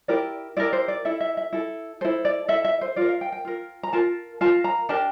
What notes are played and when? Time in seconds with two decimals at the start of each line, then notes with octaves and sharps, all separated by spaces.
0.08 E4 G4 A#4 D5
0.57 E4 G4 A#4 D5
0.73 C5
0.88 D5
1.05 E4 A4 E5
1.21 E5
1.37 E5
1.53 E4 A4
2.01 E4 A4 C5
2.25 D5
2.48 E4 A4 E5
2.65 E5
2.81 C5
2.96 F4 A#4 D5
3.09 F5
3.21 G5
3.32 G5
3.45 F4 A#4
3.83 A#5
3.93 F4 A#4 A5
4.41 F4 A#4 A5
4.64 A#5
4.89 D4 G4 A#4 A5